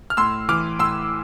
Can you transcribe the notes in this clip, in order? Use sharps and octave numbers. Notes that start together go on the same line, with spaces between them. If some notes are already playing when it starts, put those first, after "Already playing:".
F6
A2 C6 E6
E3 D6 F6
A2 C6 E6